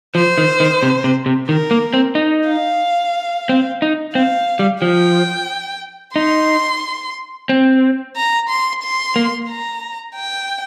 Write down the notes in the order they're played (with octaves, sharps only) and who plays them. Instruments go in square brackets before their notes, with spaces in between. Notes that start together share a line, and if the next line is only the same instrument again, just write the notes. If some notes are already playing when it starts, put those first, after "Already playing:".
[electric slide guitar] F3 [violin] C5
[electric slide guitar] D#3
D#3
C3
C3
C3
[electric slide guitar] D#3 [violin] A#4
[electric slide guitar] A#3
C4
D#4
[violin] F5
[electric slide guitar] C4
D#4
[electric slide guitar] C4 [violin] F5
[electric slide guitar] G3
[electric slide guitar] F3 [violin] G5
[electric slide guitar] D#4 [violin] C6
[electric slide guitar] C4
[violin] A#5
C6
C6
[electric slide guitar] A#3
[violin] A#5
G5